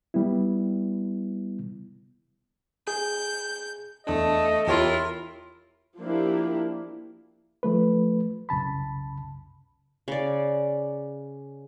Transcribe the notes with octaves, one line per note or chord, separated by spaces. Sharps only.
G3 B3 E4
G#4 G6
E2 A3 D4 D#5
E2 E4 F4 G4 A#4 C#5
F3 A#3 D4 E4 G4
F3 A3 B4
C2 F#2 C#3 A5 B5
C#3 D5